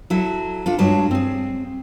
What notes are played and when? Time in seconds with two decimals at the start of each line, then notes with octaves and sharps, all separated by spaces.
0.10 F#3 E4 A4
0.66 D4 F4 A4
0.78 G2 F#3 G#3 A5
1.11 C4 G#4